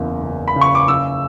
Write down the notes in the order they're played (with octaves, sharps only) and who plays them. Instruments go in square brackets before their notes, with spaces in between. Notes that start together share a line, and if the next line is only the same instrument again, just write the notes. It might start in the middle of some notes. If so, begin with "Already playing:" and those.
Already playing: [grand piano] F#1 E2
F#1
B5
C#3
C#6
D6
C#3 E6